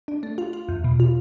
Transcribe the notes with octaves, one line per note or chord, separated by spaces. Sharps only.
D4
A3
F4
F4
E2
B2
F4